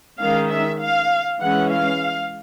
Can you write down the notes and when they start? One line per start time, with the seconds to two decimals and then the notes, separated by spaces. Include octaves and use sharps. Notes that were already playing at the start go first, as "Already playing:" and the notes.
0.18 D#3 G#3 C#4 F5
0.49 E5
0.80 F5
1.40 E3 G#3 C#4 F#5
1.71 F5